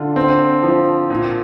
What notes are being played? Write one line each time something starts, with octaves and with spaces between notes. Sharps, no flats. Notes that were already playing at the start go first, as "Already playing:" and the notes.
Already playing: D3 F4
C4
F3
A#2